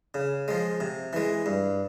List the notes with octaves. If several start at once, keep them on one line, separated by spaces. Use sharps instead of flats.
C#3
F3 G#3
C3
E3 G#3
G2